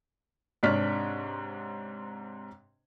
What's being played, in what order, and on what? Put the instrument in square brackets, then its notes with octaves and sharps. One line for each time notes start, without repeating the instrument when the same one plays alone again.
[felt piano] G#2 C3 D4 C#5 F6 B6